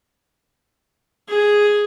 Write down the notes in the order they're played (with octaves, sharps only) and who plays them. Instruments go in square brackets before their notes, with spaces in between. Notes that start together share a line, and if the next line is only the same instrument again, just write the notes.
[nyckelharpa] G#4